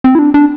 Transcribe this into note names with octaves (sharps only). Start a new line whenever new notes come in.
C4
E4
D4
D4